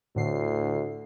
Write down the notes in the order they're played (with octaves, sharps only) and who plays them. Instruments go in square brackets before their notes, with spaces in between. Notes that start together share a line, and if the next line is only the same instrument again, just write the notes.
[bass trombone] D2 [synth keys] A2 D3 C7